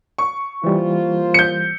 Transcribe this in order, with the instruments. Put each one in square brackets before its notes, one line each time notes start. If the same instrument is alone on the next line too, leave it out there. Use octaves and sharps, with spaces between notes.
[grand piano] C#6
[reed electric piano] E3 G3 [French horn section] A#3 F4 C5
[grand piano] G6 C#7